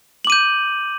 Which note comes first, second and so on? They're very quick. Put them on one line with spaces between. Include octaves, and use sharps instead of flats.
F#7 D6 D#7 G6